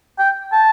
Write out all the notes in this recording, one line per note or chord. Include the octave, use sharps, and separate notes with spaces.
G5
A5